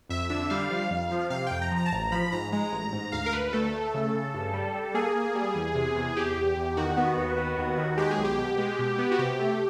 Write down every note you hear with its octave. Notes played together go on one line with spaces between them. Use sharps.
F2 E5
D3 E5
G3 F5
F3
F2
F3
C3 F5
F2 G5
A#5
F3
A#5
A5
A1 A#5
F3 B5
G#2 A#5
G#3 A#5
A1
G#2
D2 F5
A#4
D2 B4
A3 A4
A3
C#3
C#3
G2
G3
G3
A#3 G#4
A#3
G3
E2
C3
E2
E2 G4
E2
E2
D#3 F#4
B3
D#2
B3
D#2
D#3
G#3 G4
G#4
B1
G4
B2
G#3
B2
B3
F#4
C3 G4
A3